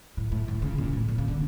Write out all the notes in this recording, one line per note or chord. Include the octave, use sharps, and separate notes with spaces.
A2
A2
A2
C#3
A#2
A2
A#2
C#3
D3